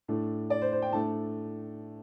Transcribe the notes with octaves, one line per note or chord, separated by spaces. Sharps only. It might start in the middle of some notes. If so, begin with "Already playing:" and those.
A2 A3 D4
D5
C5
C5
G5
A2 A3 D4 A5